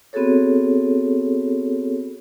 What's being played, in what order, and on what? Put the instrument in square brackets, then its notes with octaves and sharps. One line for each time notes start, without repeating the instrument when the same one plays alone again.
[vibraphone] B3 C4 F#4 G#4 A4 C#5